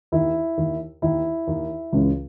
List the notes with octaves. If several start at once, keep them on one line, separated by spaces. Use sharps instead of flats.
D#2 D#3 E4
D#2 D#3
D#2 D#3 E4
D#2 D#3
C#2 C#3 E3